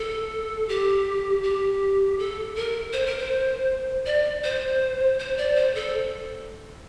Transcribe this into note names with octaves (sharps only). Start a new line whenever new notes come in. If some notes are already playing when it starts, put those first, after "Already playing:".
Already playing: A4
G4
G4
A4
A#4
C5
A#4
C5
D5
C5
C5
D5
C5
A4